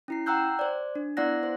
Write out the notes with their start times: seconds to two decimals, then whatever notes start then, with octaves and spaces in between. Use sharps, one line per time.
0.08 C#4 E4 C7
0.26 F#5 G5 A#5 E6 F#6 G6
0.59 C5 D5
0.95 D4
1.17 B3 E4 D5 F#5 F#6 A#6
1.43 C5